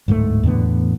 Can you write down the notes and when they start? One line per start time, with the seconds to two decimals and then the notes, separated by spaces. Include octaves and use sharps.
0.08 D1 G#2 G3 A3
0.43 E2 A2 D3 B3